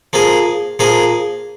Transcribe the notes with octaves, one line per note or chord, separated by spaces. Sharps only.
F3 A#3 G#4
F3 A#3 G#4